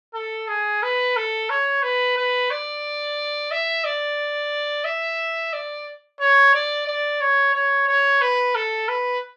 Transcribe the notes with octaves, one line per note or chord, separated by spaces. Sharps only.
A4
G#4
B4
A4
C#5
B4
B4
D5
E5
D5
E5
D5
C#5
D5
D5
C#5
C#5
C#5
B4
A4
B4